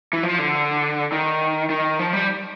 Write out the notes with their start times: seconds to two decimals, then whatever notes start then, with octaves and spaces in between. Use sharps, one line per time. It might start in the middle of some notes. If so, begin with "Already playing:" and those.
0.13 E3
0.23 F3
0.39 D3
1.12 D#3
1.70 D#3
1.99 F3
2.13 G3